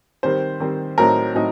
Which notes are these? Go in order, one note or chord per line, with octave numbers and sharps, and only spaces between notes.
D#3 G3 C4 C5
D#3 G3 C4
A2 F#3 C4 D#4 A#4
A2 F#3 C4 D#4